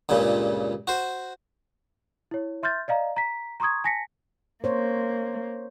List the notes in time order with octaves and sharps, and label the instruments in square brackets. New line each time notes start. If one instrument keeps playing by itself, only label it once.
[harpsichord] C#2 G2 A#2 C#3
F#4 C5
[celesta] E4 C#5
E5 C6 F6 G6 A6
D5 D#5 F5 A#5
A#5 B6
A#5 C6 C#6 D#6 G#6
G#5 A5 A#6 B6 C#7
[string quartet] A#3 [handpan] C5 C#5